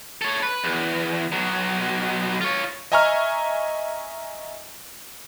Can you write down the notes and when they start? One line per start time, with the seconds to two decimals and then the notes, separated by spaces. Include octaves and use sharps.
0.22 A4 C#5
0.43 B4
0.64 E2
1.32 B1 F#3
2.41 F4 C#5
2.92 D#5 E5 G#5 A#5 C#6 F6